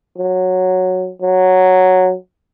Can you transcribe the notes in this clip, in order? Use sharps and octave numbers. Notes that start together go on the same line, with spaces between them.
F#3
F#3